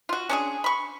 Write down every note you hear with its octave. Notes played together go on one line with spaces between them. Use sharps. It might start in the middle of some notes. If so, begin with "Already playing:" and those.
F4 F#4
C#4 D4 G#4
B5 C#6